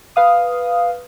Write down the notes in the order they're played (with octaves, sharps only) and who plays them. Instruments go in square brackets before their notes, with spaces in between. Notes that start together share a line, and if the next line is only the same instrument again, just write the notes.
[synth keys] B4 F5 D#6